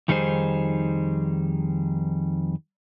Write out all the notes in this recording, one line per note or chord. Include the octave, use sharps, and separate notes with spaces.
F2 D#3 G3 D#4 G#4 C5